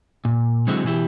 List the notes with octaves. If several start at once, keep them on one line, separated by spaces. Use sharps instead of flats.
A#2
D3 F#3 G#3 C4 E4 F#4
B2 E3 F#3 E4 G4